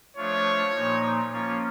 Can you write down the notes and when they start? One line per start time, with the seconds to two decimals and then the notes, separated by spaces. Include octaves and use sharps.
0.17 F3 A3 D4 F4 C#5
0.74 A#2 F3 A#3 D#4
1.32 F3 A#3 C#4 F4 C#5